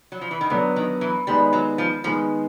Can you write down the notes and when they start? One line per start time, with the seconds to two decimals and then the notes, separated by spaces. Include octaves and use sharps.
0.12 F#3
0.21 F3
0.31 E3
0.41 D#3
0.50 D3 F#3 B3 D4
0.76 D#3
1.01 E3
1.27 D#3 G3 G#3 B3
1.53 F#3
1.78 F3
2.04 D#3 F3 G#3 B3